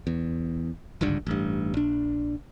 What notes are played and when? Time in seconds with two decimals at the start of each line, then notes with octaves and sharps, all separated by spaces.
0.07 E2
1.01 G#1 C#2 G2 D3
1.27 A1 G2
1.74 A#1 D4